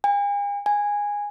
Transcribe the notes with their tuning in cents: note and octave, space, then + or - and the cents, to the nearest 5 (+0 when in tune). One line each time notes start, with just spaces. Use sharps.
G#5 -45
G#5 -15